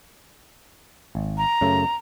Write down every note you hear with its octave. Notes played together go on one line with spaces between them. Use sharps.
G#1
A#5
F#2 C#3 A3